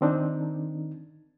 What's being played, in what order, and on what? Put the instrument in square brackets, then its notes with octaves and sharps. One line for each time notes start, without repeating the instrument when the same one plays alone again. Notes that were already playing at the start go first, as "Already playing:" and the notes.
[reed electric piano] D#3 C4 D4 D#4